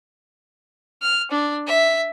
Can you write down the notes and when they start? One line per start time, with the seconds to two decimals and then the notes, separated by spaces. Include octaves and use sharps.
1.02 F6
1.31 D4
1.67 E5